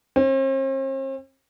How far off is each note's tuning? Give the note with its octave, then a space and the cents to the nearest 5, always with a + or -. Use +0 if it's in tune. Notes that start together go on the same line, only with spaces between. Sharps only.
C4 +45